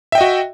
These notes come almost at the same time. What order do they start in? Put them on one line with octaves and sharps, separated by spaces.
E5 G5 D#5 F#4